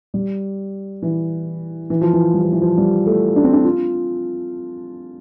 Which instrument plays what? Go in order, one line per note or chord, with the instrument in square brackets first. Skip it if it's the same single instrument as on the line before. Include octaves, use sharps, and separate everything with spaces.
[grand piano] G3
E3
E3
F3
E3
G3
F3
E3
F3
G3
A3
D4
C4
D4
F4